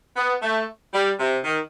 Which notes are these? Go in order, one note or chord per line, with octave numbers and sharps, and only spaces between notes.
B3
A3
G3
C3
D#3